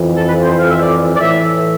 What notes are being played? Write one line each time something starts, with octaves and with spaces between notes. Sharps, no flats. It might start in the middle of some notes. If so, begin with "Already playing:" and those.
Already playing: F2 E3
A4
B4
C5
F5
E5
D5
D5
A2 E3 E5